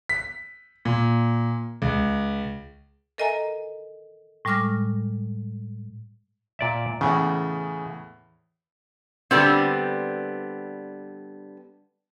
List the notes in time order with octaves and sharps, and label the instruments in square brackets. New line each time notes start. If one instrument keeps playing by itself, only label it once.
[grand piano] B6
A#2
C#2
[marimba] A4 A#4 D#5 E5 G#5 A#5
A2 G3 G#3 D6 F6 A#6
[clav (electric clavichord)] A#2 D5 E5
[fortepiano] E2 A2 [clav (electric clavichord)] C#3
[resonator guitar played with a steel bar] D3 G3 B3 C4